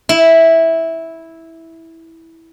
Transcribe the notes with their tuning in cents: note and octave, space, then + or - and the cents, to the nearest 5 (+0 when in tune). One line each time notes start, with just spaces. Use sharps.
E4 -10